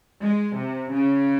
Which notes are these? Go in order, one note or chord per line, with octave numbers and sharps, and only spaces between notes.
G#3
C3
C#3